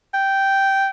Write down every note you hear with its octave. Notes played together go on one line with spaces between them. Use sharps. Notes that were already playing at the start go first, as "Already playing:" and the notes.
G5